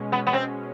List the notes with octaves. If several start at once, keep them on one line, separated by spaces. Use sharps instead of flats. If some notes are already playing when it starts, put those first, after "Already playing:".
Already playing: B2 G#3 C#4
B3
B3
C4